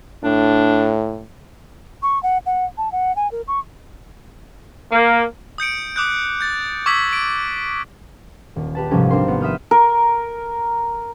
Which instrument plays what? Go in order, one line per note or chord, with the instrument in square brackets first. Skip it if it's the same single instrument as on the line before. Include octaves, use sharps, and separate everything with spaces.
[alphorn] A2 [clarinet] D4
[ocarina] C#6
F#5
F#5
A5
F#5
G#5
A#4
C#6
[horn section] A#3
[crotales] D#6 G6 C#7 D7
D6 D#6 F#6 G6
G6 A6
C#6 D6 E6 G#6 B6 F#7
D7
[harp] D#1
G4 B4 A5
G#1 C3 F3 G3 C#4 A4
C4 D4 A#4 C5 C6
B3
E5 C6 D#6 F6 G6
[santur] A#4